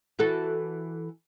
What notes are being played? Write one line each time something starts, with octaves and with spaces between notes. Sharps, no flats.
E3 F#4 A4